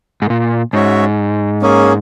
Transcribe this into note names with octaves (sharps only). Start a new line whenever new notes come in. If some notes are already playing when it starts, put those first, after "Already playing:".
G#2
A#2
G#2 C#4 F#4 C#5 E5
A#3 C#4 G#4